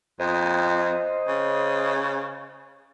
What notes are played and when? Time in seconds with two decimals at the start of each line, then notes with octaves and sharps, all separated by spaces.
0.20 F2 C5 D#5
1.28 C#3